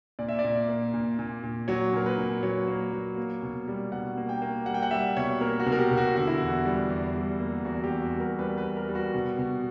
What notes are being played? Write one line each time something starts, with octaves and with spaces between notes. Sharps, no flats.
A#2 D5
E5
D5
A#2
A#3
A#2
A#2
A#2
F#3 C#5
A#2 A#4
B4
A#2
F#3 C#5
A#3
F#3
A#3
B2
G3
B2 F#5
A#3
G5
A#3
G3 F#5
G5
F#5
G3 E5
B2 C#5
A#3 A#4
F#4
B2
A#4
G4
B2
F#4
D3 F#4
E4
E2 F#4
G3
E2
G3
A#3
E2 F#4
G4
E2
F#4
G3
A#4
G3 B4
B4
G3
A#4
G3
F#4
B2
B2